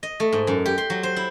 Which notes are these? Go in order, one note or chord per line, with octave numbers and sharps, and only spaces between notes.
D#5
A3
G#2
F#2
G4
C6
F#3
C5
E4